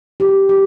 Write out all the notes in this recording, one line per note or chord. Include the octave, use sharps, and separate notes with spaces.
G4
G4